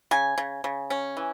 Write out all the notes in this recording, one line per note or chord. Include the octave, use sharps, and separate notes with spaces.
C#3 G#5
C#3
C#3
C#4
E3